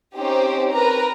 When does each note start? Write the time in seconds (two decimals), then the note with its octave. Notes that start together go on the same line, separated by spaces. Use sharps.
0.17 C4 C#4 D#4 G4 C5
0.73 A#4 B4 A#5